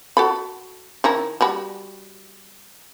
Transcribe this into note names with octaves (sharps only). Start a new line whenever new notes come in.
F#4 A4 B5
D#3 E4 A#5
G3 F#4 B5